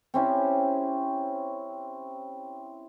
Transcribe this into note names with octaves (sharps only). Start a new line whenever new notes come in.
C4 C#4 E4 G4